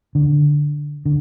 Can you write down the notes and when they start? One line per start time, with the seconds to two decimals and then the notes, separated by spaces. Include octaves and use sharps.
0.15 D3
1.06 D3